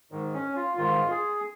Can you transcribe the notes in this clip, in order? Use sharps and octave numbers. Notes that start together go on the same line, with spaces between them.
G#2 D#3
C#4
F4
G#2 D#3 F4
G#4